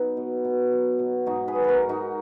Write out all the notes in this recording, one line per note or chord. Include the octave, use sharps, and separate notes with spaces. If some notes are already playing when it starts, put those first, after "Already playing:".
Already playing: F#3 B3 D#4
B2
B2
F#3
B2
G#2 D#4 F#4
G#4 B4
F#3
F#4 A#4 B4
G#2
D#4 F#4